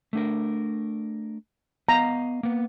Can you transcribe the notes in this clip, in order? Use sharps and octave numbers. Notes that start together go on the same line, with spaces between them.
A3 D4 A#4
B3 D#5 F5 A#5
A#3 B3